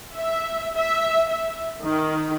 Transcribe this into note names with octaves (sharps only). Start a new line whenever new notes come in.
E5
E5
E5
D#3